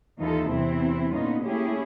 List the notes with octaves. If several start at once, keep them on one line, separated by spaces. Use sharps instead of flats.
D#2 E3 D#4 F4 A4
E2 C3 E3 C4 E4
A#2 D3 B3 C#4 D#4 F4
A3 A#3 C#4 E4 G4 G#4